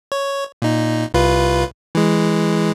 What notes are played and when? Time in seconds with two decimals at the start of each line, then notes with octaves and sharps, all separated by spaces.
0.12 C#5
0.62 A#2 D#4
1.14 C2 F4 B4
1.95 E3 G#3